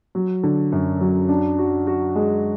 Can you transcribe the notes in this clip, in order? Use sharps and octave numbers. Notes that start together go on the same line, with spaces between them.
F#3
D3
F#2
F#3
D4
F#4
F#4
G#3